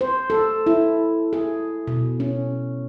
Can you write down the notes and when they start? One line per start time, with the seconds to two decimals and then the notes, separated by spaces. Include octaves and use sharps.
0.01 C5
0.30 A4
0.66 E4
1.33 G#4
1.87 B2
2.20 C#4